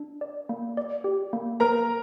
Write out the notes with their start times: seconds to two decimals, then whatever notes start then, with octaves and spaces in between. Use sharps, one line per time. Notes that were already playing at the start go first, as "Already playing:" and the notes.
Already playing: D4
0.21 D5
0.49 A#3
0.77 D5
1.04 G4
1.33 A#3
1.60 A#3 A#4 A#5